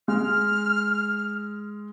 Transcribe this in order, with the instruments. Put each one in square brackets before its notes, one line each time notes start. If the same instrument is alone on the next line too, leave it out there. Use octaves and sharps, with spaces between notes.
[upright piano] G#3 [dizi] F6